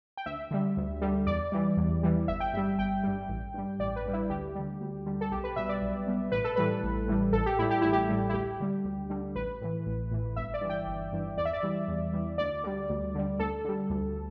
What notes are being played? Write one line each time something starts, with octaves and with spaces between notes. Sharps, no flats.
G5
D2 E5
D3 G3
D2
D3 G3
E2 D5
E3 G3
E2
E3 G3
G1 E5
G5
G2 G3 E5
G1 G5
G2 G3
A1
G2 G3
A1 D5
B4
G2 G3
E4
D2 G4
D3 G3
D2
D3 G3
A4
B1 G4
B4
B2 G3 E5
D5
B1
B2 G3
A1 B4
A4
A2 E3 G3 B4
A1
A2 E3 G3
A1 A4
G4
A2 G3 E4
G4
A1 E4
G4
A2 G3
E4
D2 G4
D3 G3
D2
D3 G3
A1 B4
A2 E3
A1
A2 E3
G1 E5
D5
G2 E3
G5
G1
G2 E3
E2 D5
E5
D5
E3 G3
E2
E3 G3
D2 D5
D3 G3
D2
D3 G3
D2 A4
D3 G3
D2